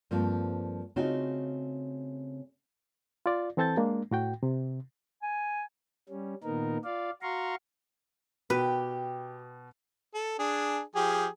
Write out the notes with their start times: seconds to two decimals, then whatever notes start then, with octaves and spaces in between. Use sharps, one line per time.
0.11 G2 F3 A3 A#3 C4
0.96 C#3 A3 C4 D#4 F4 F#4
3.26 F4 D5
3.57 E3 C4 A4 A5 G6 A6
3.77 G#3 A#3 D4
4.11 A2 F#4 G5
4.43 C3
5.22 G#5
6.09 G3 C#4
6.44 A#2 D#3 B3 D#4 A#4
6.85 F4 D5 F5
7.22 F#4 F5 A#5 C6 C#6
8.50 B2 G4 B4
10.15 A4
10.39 D4 G#4
10.95 F3 G4 G#4